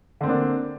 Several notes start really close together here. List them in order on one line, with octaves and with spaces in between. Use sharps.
D3 C4 A#3 D4